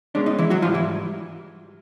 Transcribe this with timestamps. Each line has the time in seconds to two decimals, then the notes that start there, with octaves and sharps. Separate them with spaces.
0.15 B2 G#3 C#4 D4
0.26 D#4
0.38 E3 E4
0.50 F#3 F#4
0.62 G#2 E3 F3 G3 F4
0.74 E3 E4